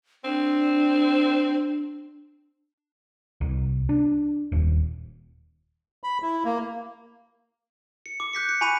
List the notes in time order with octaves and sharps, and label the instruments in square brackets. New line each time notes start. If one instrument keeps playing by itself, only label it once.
[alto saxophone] C4 [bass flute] D4
[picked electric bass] C2
D4
D#1
[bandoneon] B5
E4
A#3
[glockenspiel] C#7
D6
F#6 G6 B6 C#7
C#7
G#5 B5 C#6 B6 D#7 F7